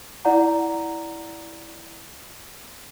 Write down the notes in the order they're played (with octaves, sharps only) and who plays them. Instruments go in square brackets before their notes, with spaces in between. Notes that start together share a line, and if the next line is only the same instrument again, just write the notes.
[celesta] E4 D5 F#5 A#5